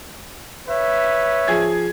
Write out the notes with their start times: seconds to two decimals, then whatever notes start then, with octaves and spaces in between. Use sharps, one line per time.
0.69 B4 C#5 E5
1.48 F3 G#4 G#6